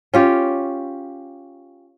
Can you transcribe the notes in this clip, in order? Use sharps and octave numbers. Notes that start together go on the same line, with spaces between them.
C#4 F4 G4